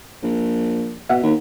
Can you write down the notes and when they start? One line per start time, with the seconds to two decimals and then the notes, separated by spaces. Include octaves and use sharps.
0.23 A#1
1.10 B2 E5 F#5
1.23 D#2